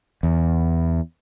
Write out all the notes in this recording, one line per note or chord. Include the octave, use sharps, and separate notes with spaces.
E2